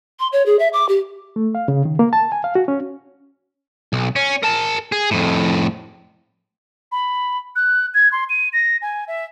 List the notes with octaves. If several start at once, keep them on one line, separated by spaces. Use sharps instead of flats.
C6
C#5
G#4
E5
D6
G4
A3
F5
C#3
D#3
A#3
A5
G#5
F5
F#4
C#4
B1
C#4
A#4 A5
G#4
F2 A2
B5
F#6
G#6
C6
D#7
A#6
G#5
E5